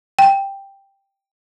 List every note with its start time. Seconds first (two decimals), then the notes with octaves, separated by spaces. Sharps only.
0.19 G5